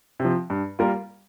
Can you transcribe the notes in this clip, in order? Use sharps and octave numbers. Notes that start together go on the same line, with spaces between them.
C3 F3
G2
G3 A#3 F4 A#4